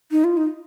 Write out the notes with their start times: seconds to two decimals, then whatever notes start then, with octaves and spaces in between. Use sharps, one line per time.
0.11 D#4
0.24 F4
0.37 D#4